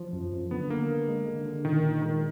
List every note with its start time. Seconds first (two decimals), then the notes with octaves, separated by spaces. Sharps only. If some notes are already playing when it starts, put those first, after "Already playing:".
Already playing: F3
0.13 F#2
0.32 F#2
0.51 D3 B3
0.70 D3 A#3
0.89 D3
1.08 G#3
1.26 D3
1.46 D3
1.65 A#2 D#3
1.83 A#2
2.02 D#3 G#3